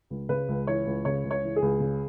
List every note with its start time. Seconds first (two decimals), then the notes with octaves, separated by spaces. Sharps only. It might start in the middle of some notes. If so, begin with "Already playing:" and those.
0.10 C#2
0.29 C#3 B4
0.48 C#2
0.67 E3 C#5
0.86 C#2
1.05 C#3 C#5
1.24 C#2
1.31 C#5
1.44 E3
1.56 G#4
1.62 C#2
1.80 C#3